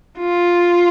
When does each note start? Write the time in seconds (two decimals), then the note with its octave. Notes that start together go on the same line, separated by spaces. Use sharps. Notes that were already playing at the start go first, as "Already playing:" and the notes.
0.19 F4